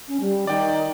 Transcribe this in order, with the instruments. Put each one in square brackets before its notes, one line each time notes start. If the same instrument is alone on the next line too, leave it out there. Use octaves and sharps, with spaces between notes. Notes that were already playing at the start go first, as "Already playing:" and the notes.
[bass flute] C#4
G3
[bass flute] D#3 [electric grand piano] D5 G5